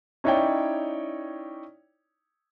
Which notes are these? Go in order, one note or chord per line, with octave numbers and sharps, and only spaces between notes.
C#4 D#4 E4 C#5 D5 G5